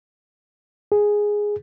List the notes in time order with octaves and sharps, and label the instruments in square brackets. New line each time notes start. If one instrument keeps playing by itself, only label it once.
[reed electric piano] G#4